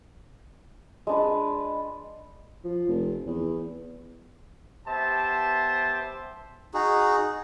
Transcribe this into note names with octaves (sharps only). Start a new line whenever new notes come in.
G#3 D4 B4
F3
F1
E2
B3 G4 C5 E5 A5
D#4 F#4 G#4